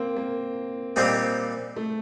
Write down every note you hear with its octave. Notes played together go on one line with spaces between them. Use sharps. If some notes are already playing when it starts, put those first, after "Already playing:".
Already playing: A#3 C4
A#3
A#2 G3 C4 D#4 G4
A3